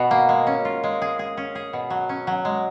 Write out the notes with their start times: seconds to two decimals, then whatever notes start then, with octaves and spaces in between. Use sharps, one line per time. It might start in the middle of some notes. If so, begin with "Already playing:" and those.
Already playing: B2 F#4
0.11 A#3
0.29 G#3
0.47 C#4
0.65 F4
0.84 G#3
1.02 G#4
1.19 G#4
1.37 C#4
1.55 G#4
1.73 B2
1.90 F#3
2.09 C#4
2.27 F#3
2.45 G#3